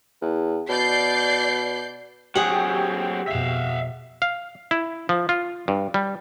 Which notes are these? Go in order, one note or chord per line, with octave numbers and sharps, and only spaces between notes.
E2
B2 D5 G6 C7
F#3 C4 G4 G#4 F#5
F2 B2 E5 F5
F5
E4
F3
F4
G2
G3